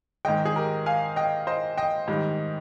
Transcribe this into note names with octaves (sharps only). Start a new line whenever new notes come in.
G#2 D#3 G#3 D#5 G5
G#4
G4 A#4
F5 G#5
D#5 G5
C5 D#5
D#5 G5
G#2 D#3 G3